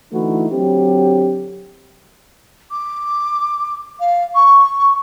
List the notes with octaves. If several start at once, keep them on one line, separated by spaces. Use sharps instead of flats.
D3 E3 A3 D#4 E4 F#4
D3 F#3 C4 G4
D6
F5
C#6